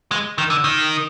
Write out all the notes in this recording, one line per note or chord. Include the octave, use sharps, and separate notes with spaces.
G#3
D#3
D3
D#3